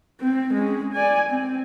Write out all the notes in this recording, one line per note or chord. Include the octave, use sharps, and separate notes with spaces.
C4
G#3 C#4
D5 G#5
C4